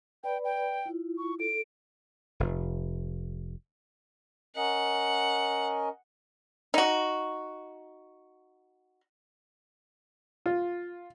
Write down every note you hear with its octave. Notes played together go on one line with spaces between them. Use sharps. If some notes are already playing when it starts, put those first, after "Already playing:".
B4 D5 G5 B5
G5
E4 F4
C#6
A4 D7
F1
C#4 A#4 D#5 F#5
D#4 F#4
F4